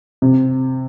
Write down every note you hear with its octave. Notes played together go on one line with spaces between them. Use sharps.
C3